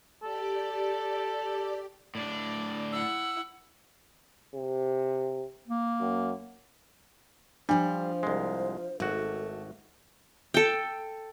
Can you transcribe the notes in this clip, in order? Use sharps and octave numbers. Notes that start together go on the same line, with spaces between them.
G4 A4 D5
A2 D4 D5
E4 F#5 E6
C3
A#3
F#2
F3 G3 D4 F4 C5
C2 G#3
G#1 A3 F#4 A4
A4 G5